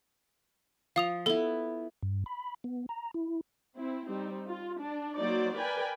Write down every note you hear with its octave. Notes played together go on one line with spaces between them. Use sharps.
F3 F5 D#6 F7
B3 E4 A4 G7
G2
B5
B3
A#5
E4
C4 E4
G3 C4 D#4
F4
D4
F#3 A#3 D#4 C5 D5
A#4 B4 D5 G5 G#5 B5